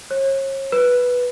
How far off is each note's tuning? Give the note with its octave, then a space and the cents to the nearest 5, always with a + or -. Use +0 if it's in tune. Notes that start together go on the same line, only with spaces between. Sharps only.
C#5 -40
B4 -5